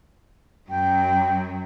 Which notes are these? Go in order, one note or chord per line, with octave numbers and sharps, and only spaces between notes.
F#2 F#3 G5